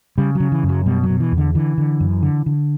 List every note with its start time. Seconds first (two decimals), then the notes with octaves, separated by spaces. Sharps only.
0.18 C#3 G3
0.35 C#3 F#3
0.52 E3
0.63 F#2
0.69 F#3
0.86 B2 G3
1.03 F#3
1.10 B2
1.20 E3
1.32 E2
1.38 D3
1.55 D3 E3
1.78 D3
2.00 F#2
2.23 D3
2.46 D3